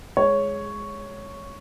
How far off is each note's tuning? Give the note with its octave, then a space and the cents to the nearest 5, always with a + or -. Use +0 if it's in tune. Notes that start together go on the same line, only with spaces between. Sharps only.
G#3 +0 C#5 +0